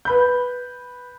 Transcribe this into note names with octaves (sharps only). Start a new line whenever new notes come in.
B4 B5 G6